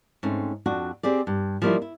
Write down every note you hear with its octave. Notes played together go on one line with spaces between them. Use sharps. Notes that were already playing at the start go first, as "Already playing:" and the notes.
G#2 A3 C4 C#4
F2 D4 F#4
C4 G4 G#4 D5
G2
F3 G3 A#3 B3 D#4 E4
E4